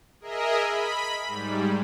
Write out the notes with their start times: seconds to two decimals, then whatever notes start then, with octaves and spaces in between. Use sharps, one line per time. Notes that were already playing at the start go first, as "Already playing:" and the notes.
0.21 G#4 A#4 D#5 E5
0.61 B5
1.27 G#2 G3